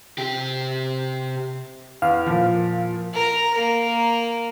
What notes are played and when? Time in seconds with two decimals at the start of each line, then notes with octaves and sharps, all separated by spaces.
0.18 C3 G4
2.02 E2 F5
2.26 A#2 F3
3.14 A#4 A#5
3.54 A#3 A#4